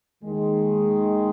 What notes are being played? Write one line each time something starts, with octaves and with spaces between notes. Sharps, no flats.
D#2 D#3 G#3